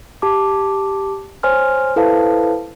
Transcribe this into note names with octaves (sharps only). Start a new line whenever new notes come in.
G4 A5 D6
C5 C#5 G#5 C6 F6
E4 A4 B4 C5 F5 A5